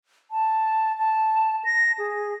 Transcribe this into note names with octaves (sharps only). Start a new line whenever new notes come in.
A5
A5
A#6
G#4